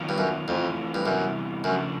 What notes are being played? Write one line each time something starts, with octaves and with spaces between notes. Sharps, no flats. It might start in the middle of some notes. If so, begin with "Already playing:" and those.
Already playing: D#3 F#3 B3 F4
G2
F#2
F2 E3 A3 C4 F4
G2
F#2 C3 E3 G3 B3
F#2 C#3 F3 A3 D4